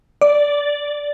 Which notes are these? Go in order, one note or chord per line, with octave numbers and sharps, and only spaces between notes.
D5